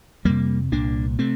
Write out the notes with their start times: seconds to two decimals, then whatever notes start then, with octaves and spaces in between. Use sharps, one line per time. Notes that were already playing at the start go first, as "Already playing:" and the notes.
0.25 F2 C3 G3 A#3
0.72 C2 A#2 A#3 D4
1.19 C3 A3 C4